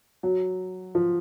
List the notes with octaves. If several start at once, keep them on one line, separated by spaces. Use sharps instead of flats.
F#3
F3